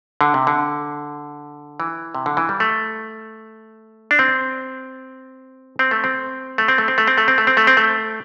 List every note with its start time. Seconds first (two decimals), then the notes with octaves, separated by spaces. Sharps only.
0.21 D3
0.34 C3
0.47 D3
1.80 E3
2.15 C3
2.26 D3
2.37 E3
2.49 G3
2.60 A3
4.11 D4
4.19 C4
5.79 C4
5.91 A3
6.04 C4
6.58 A3
6.68 C4
6.78 A3
6.88 C4
6.98 A3
7.07 C4
7.18 A3
7.28 C4
7.38 A3
7.47 C4
7.57 A3
7.67 C4
7.77 A3